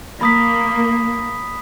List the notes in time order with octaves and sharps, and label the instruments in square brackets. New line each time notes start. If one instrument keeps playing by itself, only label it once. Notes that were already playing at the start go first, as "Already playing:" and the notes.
[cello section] A#3 [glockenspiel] B5 D#6 B6